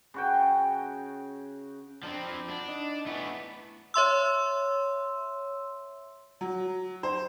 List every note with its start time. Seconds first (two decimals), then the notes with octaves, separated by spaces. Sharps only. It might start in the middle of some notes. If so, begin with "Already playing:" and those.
0.14 C#3 F#4 G5
2.03 F3 C4 D4 A#5 B5
2.50 D4 F#5
2.68 D#4
3.06 E3 A3 B3
3.94 C#5 E5 C6 E6
6.41 F#3
7.03 C5